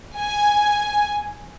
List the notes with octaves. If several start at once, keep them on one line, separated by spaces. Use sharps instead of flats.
G#5